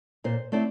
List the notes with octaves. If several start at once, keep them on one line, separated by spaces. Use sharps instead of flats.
A#2 C5
A3 C4 E4 D5